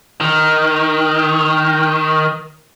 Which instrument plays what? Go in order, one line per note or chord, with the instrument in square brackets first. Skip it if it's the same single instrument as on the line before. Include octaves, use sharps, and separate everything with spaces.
[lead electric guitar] D#3